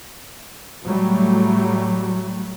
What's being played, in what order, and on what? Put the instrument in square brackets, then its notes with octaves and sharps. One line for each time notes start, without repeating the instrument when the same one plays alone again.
[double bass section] A2 F#3 G3 A3